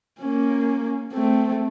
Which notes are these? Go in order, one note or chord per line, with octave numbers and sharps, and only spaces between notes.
A#3 C#4
A3 C4